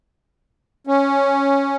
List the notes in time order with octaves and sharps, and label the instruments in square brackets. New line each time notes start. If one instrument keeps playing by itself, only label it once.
[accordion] C#4